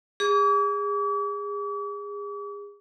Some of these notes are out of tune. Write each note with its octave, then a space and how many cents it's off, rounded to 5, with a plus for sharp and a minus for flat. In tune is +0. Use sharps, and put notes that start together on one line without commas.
G#4 -30 D6 -45